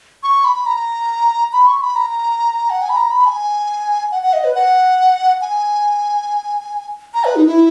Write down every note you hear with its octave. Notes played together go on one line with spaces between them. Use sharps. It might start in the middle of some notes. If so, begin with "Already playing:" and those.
C#6
B5
A#5
B5
C#6
B5
A#5
F#5
G#5
B5
A#5
B5
G#5
F#5
F#5
D#5
B4
F#5
G#5
A#5
B4
D#4
E4